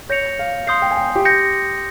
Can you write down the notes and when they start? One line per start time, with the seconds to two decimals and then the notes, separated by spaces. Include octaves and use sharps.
0.09 C#5 G6 A#6 C#7 F7
0.39 F5
0.67 F5 C6 D#6 G6 C7
0.82 G5
0.91 G#5
0.97 G5
1.15 G4
1.25 G6 A#6 C#7